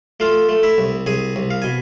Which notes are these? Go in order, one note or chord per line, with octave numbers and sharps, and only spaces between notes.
A3 F4 F5
A3
E4 E5
C2
C2 G#4 G#5
C2
F5
B2 G#5